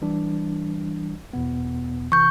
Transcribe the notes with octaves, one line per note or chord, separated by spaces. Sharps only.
E3 G3 D4
E2 B2 B3
C3 E3 C#6 G6